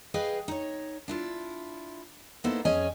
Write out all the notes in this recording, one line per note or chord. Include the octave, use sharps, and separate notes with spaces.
G#4 B4 D#5 F5 G5 G#5
D#4 C#5
D4 E4 F4
A#3 B3 D#4 E4 A4 C5
F2 C#4 G#4 C#5 D#5 G#5